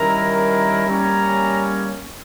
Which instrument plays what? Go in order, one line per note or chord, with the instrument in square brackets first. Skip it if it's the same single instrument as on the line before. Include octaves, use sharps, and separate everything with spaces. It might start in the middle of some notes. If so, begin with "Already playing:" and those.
Already playing: [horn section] D#3 G3 C#4 E4 A#4 [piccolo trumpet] A#5
[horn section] G3 A#3 C#4 [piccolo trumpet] A#5